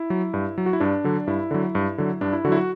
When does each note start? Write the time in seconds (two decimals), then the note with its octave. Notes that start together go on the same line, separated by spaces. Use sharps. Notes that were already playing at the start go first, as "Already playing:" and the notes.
Already playing: E4
0.10 F#3
0.34 G2
0.58 F#3
0.66 F#4
0.73 E4
0.80 G2 D4
1.04 D3 F#3
1.27 G2 E4
1.51 D3 F#3
1.75 G2
1.98 D3 F#3
2.21 G2 D4
2.33 E4
2.45 D3 F#4
2.48 F#3 E4
2.57 F#4